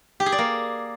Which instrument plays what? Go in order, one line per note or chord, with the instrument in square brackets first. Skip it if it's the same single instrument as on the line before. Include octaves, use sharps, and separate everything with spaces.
[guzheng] G4
G#4
D5
A#3